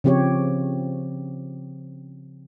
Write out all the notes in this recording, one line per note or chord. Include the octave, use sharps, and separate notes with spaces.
C#3 F3 C4 G4 C#5